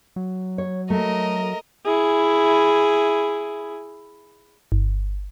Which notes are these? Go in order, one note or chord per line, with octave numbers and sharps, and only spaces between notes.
F#3
C#5
A3 A#4 D#5
E4 G#4
G1